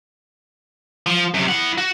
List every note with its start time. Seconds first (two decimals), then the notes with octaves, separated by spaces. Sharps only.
1.06 F3
1.34 F#2 C3
1.48 E4 F#5
1.78 F#4